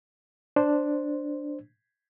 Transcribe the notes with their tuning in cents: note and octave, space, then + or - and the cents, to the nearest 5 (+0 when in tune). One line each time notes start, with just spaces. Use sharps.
D4 +0 C5 +0